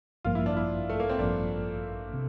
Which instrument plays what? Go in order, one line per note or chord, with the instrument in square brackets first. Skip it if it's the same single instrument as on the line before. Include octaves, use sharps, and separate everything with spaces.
[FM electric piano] A1 G2 F3 A#3 [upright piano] F4
[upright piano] E4
D4
E4
A3
A#3
C4
[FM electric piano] A1 G2 F3 A#3 [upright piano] D4
[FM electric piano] C3